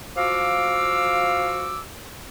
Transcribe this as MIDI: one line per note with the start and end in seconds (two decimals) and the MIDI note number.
0.17 1.80 53
0.17 1.80 66
0.17 1.80 77
0.17 1.80 86
0.17 1.80 88